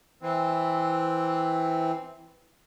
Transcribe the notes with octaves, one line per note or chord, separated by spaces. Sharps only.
E3 C4